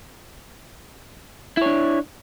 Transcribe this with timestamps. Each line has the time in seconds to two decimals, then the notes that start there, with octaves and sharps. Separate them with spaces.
1.57 E4
1.62 C#5
1.66 D4